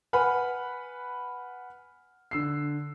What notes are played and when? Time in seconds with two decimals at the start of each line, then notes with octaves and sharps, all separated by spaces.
0.13 B4 F#5 G#5 B5 F6
2.31 D3 E6 C7